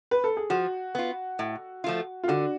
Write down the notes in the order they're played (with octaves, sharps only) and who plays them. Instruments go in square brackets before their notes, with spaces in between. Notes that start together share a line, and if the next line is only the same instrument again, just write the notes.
[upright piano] B4
A4
G#4
[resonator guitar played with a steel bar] F3 [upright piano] F#4
[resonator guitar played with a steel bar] B3 F4
A2
F3 A3 F4
[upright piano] F4
[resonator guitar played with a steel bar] D3 [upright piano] F#4